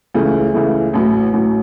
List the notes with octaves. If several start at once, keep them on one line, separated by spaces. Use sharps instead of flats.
C#2 C#3 E3 A3
C#2 C#3 E3 A3
A1 A2 F#3
A1 A2 F#3